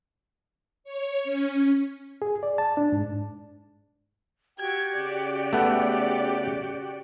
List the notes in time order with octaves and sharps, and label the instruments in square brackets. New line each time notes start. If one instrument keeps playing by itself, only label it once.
[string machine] C#5
C#4
[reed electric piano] G#4
D5
A5
D4
G#2
[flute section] F#4 G4 G5 [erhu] G#6
[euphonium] C#3 [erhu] D5
[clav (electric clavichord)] A3 B3